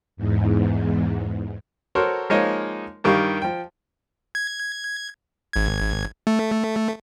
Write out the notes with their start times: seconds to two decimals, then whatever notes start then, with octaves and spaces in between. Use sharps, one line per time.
0.17 E2 G#2
1.95 F#4 A4 A#4 C5 C#5
2.30 F3 G#3 A#3 D#4 C#5 D#5
3.04 G2 D#3 G3 G4 F5 C#6
3.42 F3 G5
4.35 G#6
5.53 G#1 G#6
6.27 A3